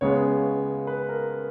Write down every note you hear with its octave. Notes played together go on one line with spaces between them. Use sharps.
C#2 C#3 G#3 B3 C#5
B4
A#4